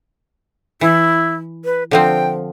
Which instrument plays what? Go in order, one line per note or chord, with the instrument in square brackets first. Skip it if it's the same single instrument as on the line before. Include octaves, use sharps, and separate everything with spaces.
[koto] E3 [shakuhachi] E4
[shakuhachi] B4
[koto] D3 F3 C4 [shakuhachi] G5